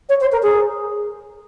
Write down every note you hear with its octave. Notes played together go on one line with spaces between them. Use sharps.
C#5
C5
A#4
G#4